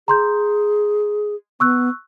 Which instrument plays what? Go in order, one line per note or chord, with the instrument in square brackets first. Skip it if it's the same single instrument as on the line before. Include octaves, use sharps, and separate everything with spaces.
[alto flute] G#4 [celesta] A#5 C6 G6
[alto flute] B3 [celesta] C#6 E6 F#6